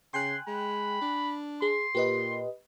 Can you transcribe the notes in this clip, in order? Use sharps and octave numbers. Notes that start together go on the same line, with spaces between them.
C#3 G5 G#5 C6 F#6
G#3 B5
D4
G#4 C6
A#2 G4 B4 D#5